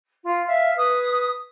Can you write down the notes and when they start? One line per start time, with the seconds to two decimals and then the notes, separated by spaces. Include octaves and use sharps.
0.23 F4
0.47 E5 F5
0.77 B4 D#6